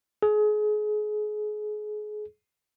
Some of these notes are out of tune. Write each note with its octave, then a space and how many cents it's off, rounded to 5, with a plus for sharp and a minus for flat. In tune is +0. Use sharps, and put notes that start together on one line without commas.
G#4 +30